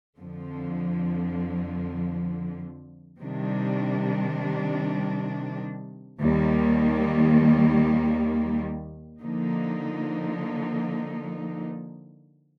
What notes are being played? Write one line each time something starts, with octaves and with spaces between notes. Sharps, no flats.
F2 D3 F3
C3 D#3 G3 D4
D#2 D#3 G3 A#3
D3 F3 A#3 D#4